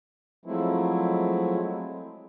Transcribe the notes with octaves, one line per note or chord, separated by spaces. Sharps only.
F3 F#3 G#3 A3 C4 E4